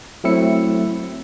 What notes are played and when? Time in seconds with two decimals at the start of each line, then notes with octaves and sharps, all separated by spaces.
0.24 F#3 A3 C4 E4 E6 C#7